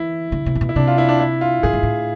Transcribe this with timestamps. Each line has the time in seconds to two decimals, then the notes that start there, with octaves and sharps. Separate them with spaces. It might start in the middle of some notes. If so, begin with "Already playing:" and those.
Already playing: E3 E4
0.32 D3
0.46 C3
0.55 A2
0.61 B2
0.69 E4
0.76 C3 D4
0.87 F4
0.98 E4
1.09 D4
1.20 E4
1.41 F4
1.63 A2 G#4
1.73 G#2
1.83 A2